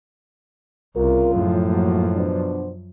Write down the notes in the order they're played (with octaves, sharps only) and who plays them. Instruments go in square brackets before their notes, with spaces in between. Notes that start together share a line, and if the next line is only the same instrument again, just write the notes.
[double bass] C2 [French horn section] C#3 F4 [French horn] A#4
[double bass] F#2 F3 [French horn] A2
[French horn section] F#3 A#3
B2 D4 C5